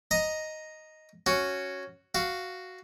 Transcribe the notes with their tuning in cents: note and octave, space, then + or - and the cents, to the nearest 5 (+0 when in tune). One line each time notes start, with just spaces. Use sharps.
D#5 +0 A#5 +0
C#4 +0 F#4 +0
F#4 +0 F5 -5